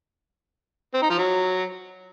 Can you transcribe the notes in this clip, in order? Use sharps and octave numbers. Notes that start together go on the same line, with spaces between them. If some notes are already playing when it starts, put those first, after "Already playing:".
C4
D#4
F3
F#3